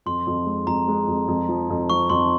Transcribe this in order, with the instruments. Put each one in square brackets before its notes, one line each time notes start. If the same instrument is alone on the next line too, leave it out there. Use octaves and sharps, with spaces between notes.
[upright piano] F2 [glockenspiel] C6
[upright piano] F2
G#3
[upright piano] F2 [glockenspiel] A#5
[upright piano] G#3
F2
F2
F3
F2
[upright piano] F3 [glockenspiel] C#6
[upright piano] F2 [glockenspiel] C6